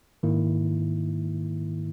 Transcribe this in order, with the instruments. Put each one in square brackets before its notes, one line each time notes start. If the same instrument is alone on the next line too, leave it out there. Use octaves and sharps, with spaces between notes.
[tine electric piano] G#2 D#3 A#3 E4